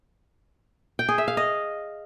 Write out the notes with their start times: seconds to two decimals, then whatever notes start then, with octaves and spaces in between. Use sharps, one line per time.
0.99 G5
1.09 G#4
1.18 E5
1.28 F5
1.37 D#5